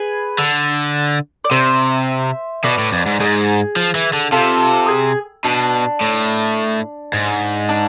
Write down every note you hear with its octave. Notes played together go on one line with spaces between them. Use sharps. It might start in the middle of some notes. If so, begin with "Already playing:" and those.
Already playing: G#4 B4
D3
D5
C3 C5 E5
B2 B4 D5
A2
F2
G#2
G#2 G#4
F3
E3
D3
C3 F4 A4
G#4
B2 D4
A2
G#2
D4